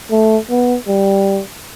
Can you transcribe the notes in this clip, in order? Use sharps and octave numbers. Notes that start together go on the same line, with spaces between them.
A3
B3
G3